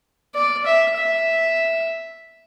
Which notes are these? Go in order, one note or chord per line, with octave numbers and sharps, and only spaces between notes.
D5
E5
E5